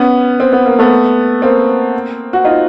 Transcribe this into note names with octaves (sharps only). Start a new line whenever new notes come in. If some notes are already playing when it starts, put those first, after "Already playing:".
Already playing: B3 C#4
C4
B3
A#3
A3 B3
A#3 C4
F#4
D#4 F4